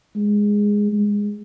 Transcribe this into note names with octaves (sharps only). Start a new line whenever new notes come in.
G#3
G#3